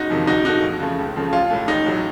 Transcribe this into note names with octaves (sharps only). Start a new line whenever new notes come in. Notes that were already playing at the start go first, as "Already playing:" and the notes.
Already playing: F#1 D#4 F#4
F2 C3 D#3
A#1 D#4 F#4
A#2 A3 D#4 F#4
F2
C#3 F3 A3
C#2
C#3 F3 A3
A1 F4
A2 A3
A1 D#4
A2 F#3